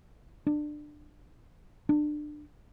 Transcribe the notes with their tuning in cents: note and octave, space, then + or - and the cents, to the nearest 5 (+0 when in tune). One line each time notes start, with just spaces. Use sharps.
D4 +20
D4 +25